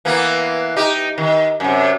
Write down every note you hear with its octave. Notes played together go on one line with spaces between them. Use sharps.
E3 A#3 B3
D#4 G4
D#3
F#2 C3